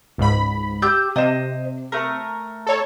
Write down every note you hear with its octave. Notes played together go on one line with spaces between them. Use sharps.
C#2 G#2 B5
G4 E6 G6
C3 C5 D#5
A3 A#4
A4 C#5